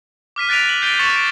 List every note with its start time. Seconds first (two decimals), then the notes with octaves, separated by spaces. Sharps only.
0.36 D6 F6 B6 D#7
0.49 F#6 A6 B6 D7 D#7 F7
0.69 F#7
0.82 G6 A6 C7 D7 D#7 G7
0.99 C#6 D6 A6 C#7 E7 F#7
1.12 A6 D7